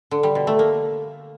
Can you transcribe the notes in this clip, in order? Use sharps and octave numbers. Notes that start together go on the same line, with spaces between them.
D3
G3
B2
A3
A#3